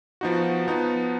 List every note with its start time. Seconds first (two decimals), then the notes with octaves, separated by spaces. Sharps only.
0.21 F3 B3 D#4 F#4
0.67 F3 B3 D#4